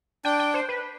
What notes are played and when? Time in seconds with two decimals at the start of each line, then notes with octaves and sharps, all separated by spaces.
0.25 D4 G5
0.39 G5
0.54 C5
0.69 B4